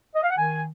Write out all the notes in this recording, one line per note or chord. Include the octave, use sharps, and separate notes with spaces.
D#5
F5
F#5
D#3 G#5